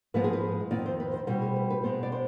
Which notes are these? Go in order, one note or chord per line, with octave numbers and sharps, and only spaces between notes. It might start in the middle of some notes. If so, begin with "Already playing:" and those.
G#2 F3 G#3 B3 B4
G#4
B4
F2 D#3 B3 D5
C5
B4
C5
B2 G3 C4 C5
G#4
B4
B4
B2 G#3 B3 C5
D5
C5